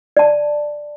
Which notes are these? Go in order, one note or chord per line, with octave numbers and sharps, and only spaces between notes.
D5 A5